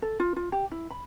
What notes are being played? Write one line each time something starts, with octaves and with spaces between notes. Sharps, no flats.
A4
F4
F4
G4
E4
B5